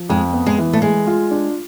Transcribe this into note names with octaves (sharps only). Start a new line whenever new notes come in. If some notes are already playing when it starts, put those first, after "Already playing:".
Already playing: F3
F2 G#3
B3
G#3
E3
A3
G#3 G#4
F4
D4